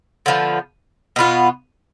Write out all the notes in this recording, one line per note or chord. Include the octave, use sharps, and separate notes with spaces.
D3 F3 B3
B2 B3 F4